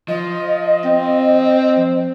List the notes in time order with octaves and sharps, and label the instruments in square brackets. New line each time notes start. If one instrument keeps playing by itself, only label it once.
[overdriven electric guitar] F3 [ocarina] D#5
[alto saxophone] C4